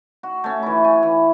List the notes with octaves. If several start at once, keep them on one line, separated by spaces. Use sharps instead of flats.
F#4
A3 C#4
E3 E4
G#5
E3